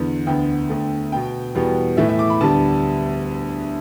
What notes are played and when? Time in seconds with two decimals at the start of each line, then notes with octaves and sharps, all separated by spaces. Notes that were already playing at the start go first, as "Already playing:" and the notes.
Already playing: E2 D3 B3
0.27 D2 D3 B3 G5
0.69 D2 D3 A3
1.12 B2 B3 G5
1.55 E2 B2 G3 B3
1.97 A2 E3 A3 E5
2.09 E5
2.19 D6
2.30 B5
2.41 D2 D3 G3 B3 A5